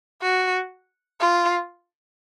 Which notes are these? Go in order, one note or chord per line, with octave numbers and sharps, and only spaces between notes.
F#4
F4